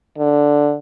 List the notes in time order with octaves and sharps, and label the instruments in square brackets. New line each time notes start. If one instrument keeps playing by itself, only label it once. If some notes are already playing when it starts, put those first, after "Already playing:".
[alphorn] D3